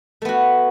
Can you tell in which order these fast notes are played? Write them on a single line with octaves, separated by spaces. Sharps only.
A3 B3 F#4